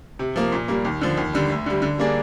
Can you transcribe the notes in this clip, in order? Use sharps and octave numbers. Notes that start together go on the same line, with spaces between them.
C3
F3 A#3
A#2
G3 A#3
D#2
D3 F3
D#2
D3 G3
D2
D3 G3
D3
G3 A#3 D4 G#4